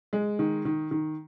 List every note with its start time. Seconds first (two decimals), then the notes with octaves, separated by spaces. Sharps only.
0.13 G#3
0.39 D#3
0.65 D#3
0.91 D#3